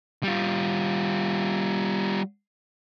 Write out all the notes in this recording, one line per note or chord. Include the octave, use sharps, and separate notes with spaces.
G3 F4